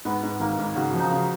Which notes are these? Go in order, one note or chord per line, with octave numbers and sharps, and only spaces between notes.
G#2 B3
G#2
G#1 A#3
G#2
C#3 F#4
F3
D#4
C#3